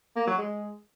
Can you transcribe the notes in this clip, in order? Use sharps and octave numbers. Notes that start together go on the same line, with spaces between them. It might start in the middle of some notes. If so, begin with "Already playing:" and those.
A#3
F#3
G#3